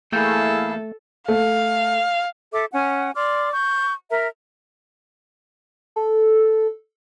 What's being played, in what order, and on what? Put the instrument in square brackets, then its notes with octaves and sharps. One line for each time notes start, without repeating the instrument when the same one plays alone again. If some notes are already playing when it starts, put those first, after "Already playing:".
[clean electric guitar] E2 A#3 G5 [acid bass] A3 [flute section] E4 G#4 F5 [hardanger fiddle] A4
[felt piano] A3 [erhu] F5
[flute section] A4 E5 D6
C#4 F#5 G#5
D5 C6 D6 F6
C#6 G6
A#4 E5 A#5
[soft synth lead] A4